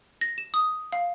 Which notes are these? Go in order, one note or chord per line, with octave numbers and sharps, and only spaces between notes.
A#6
E7
D#6
F5